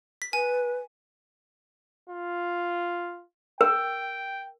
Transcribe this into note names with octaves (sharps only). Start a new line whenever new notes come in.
B6
B4 G#5
F4
A#4 G5